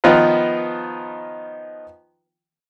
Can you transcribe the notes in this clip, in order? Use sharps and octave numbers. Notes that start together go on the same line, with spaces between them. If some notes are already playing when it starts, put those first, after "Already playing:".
D#3 F3 B3 D#4 F4 B4